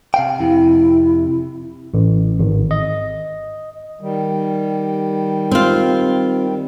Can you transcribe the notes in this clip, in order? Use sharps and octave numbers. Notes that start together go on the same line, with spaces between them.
C3 F5 G5
F2 C3 E4
A1
G#1
D#5
D#3 G3
C4 F4